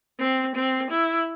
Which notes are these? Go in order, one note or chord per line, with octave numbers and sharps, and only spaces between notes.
C4
C4
E4